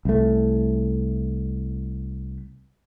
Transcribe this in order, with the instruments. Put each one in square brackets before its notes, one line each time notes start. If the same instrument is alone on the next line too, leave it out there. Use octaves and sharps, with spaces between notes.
[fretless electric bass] C2 A3